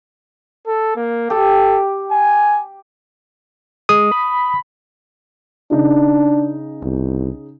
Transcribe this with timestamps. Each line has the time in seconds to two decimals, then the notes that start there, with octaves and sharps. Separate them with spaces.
0.67 A4
0.96 A#3
1.30 G4 A4
2.11 G#5
3.89 G#3 D#6
4.11 B5
5.71 C#3 D4 D#4
6.82 C2